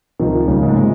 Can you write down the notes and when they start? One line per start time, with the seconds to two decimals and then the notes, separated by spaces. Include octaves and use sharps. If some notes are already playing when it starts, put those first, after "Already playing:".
0.19 C#2 C3 D#3 F3
0.48 D#2 C#3 F3 G3
0.62 G#2 G#3
0.76 C3 F3 G#3